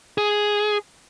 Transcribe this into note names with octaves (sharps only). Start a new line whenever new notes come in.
G#4